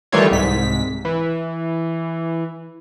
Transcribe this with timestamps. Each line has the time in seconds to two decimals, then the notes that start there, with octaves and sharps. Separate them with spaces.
0.12 D#3 E3 G3 A3 F4 C#5
0.31 C2 G#2 B6
1.05 E3